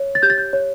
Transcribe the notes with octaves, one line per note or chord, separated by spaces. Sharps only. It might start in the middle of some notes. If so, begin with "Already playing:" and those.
Already playing: C#5
A6
G4 G6
A6
G6
C#5